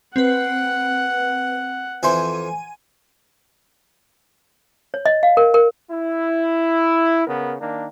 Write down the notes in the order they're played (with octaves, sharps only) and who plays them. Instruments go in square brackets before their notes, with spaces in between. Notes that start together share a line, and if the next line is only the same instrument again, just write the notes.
[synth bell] C4 B4 [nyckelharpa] F#5
[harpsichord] F2 E3 C5 [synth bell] G#5
[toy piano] C#5
D#5
F5
A#4
A#4
[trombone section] E4
C#3 B3 A#4
D#3 A#3 D4